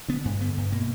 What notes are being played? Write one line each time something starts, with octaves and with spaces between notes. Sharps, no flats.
D3 B3
G2
D3 B3
G2
B2 A#3